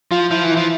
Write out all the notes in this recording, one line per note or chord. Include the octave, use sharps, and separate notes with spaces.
F3 F4
F3 E4
E3
E4
F3